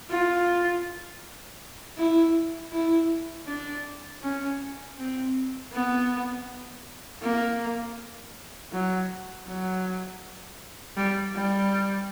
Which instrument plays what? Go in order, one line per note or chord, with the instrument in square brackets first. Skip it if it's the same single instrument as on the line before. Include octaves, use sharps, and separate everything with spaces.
[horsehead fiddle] F4
E4
E4
D4
C#4
C4
B3
A#3
F#3
F#3
G3
G3